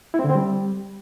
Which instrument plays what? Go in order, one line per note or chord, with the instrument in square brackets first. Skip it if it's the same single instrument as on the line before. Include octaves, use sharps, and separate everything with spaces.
[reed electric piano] E4
C4
D3
C4
G3